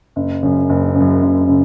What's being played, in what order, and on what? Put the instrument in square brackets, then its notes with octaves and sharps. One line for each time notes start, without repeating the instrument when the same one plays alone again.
[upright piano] F#1
F#2 C#3
F#1
C#3
F#2
F#1
C#3